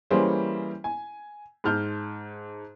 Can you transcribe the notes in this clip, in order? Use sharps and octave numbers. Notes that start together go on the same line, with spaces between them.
E3 G3 A#3 C#4 G#4 C5
G#5
G#2 A5 F6 G6